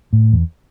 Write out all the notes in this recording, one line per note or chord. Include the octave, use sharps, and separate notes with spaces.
A2
E2